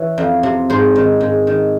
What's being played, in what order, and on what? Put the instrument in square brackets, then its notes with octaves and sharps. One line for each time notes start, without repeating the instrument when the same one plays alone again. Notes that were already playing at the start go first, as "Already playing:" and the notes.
Already playing: [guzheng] E3 C#5
F2
C3
G#2 C5
D#3
G#2
D#3